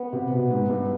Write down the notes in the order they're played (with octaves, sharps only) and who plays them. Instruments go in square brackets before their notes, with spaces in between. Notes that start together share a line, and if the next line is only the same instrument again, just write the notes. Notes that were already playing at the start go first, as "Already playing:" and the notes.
Already playing: [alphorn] B3
[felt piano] C3
B2
G#2
G2